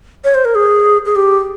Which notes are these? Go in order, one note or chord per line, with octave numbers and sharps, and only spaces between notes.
C#5
C5
A#4
G#4
G#4
G4